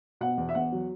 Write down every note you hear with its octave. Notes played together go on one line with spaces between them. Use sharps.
B2 F#5
E2
E5
E2 F#5
F#3